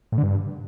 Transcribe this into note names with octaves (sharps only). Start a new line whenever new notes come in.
A2
D3
G2